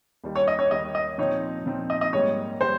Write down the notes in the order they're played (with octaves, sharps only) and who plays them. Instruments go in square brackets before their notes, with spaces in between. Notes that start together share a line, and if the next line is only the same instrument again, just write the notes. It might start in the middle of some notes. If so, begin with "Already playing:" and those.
[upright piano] D#2 D#3 G3
[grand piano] C#5
D#5
C#5
[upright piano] D#2 D#3 G3 [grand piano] D#5
[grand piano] D#5
[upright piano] A#2 F3 C4 D#4 [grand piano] C#5
[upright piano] A#2 F3 C4 D#4
[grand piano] D#5
D#5
[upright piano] G#2 G3 A#3 [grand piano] C#5
[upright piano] G3 [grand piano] C5